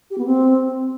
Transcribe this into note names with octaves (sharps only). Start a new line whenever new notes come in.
G4
B3
C4